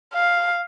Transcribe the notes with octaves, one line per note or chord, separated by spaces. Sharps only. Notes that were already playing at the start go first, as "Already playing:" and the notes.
F5